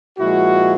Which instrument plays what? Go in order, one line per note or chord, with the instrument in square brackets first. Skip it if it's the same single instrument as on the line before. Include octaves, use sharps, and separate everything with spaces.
[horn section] A#2 F3 G#3 E4 F#4